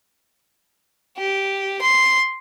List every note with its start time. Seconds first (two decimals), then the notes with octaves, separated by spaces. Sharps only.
1.18 G4
1.82 C6